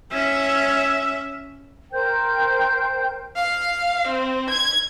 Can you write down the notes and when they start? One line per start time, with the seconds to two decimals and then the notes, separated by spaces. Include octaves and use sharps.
0.12 C#4 E5
1.92 A#4 C5 G5 G6
3.36 F5
4.07 C4
4.49 G#6